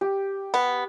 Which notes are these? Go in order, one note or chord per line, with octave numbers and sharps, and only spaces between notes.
G4
B3